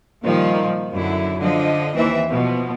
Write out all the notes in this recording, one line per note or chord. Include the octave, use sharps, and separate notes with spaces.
A#2 D#3 F3 G3
F#2 D3 E4
D3 F3 D#5
D#2 E3 C4 E5
B2 F3 B3